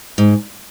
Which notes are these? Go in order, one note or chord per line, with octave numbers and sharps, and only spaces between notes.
G#2